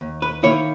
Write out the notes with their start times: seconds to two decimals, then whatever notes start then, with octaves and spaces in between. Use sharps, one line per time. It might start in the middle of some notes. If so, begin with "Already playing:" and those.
0.01 D#2
0.22 B4
0.43 D#3 A#3 E4 C#5